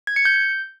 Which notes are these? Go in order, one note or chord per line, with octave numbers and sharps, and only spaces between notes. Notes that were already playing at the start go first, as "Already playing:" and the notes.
G#6
C#7
G6